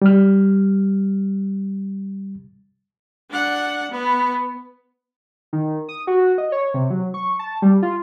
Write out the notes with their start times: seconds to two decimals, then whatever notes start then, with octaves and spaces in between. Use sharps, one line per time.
0.02 G3 F6
3.30 D4 F#5
3.91 B3
5.53 D#3
5.89 D#6
6.07 F#4
6.38 D#5
6.52 C#5
6.74 C3
6.90 F#3
7.14 C#6
7.39 A5
7.62 G3
7.83 F4